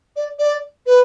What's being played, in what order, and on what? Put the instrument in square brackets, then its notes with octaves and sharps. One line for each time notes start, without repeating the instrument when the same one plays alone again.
[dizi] D5
D5
B4